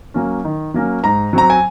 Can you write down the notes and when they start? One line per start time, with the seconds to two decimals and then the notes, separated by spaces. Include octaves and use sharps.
0.14 F#3 A#3 C#4
0.45 D#3
0.74 F#3 A#3 C#4
1.03 G#2 A#5
1.33 F#3 C4 A#5
1.50 G#5